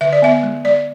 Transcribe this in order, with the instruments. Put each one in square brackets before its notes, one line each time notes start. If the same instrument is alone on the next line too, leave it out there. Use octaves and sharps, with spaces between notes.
[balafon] D3 E5
D5
B3 E5
G#3
G#3 D5